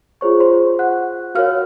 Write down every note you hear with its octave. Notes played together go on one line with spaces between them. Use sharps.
F4 G#4 C5 C#5 C#6
C5 C6
F#5 F#6
F#4 A#4 C#5 F5 F6